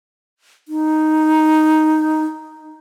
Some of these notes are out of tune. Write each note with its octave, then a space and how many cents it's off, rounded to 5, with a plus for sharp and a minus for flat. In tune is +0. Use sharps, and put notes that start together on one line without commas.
D#4 +0